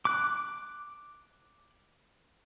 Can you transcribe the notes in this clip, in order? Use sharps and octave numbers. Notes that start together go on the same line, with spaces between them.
D6 F#6